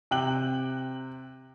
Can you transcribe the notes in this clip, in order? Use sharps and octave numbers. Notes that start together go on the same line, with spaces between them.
C3 G5 F#6 F#7